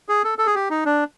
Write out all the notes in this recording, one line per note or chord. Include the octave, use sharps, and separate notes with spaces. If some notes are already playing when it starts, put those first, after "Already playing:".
G#4
A4
A4
G#4
G4
D#4
D4